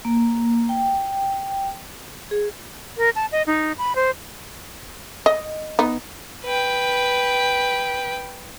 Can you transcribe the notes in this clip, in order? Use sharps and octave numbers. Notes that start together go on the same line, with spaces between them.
A#3
G5
G#4
A#4
A5
D#5
D#4
B5
C5
D#5
B3 D#4
B4 G5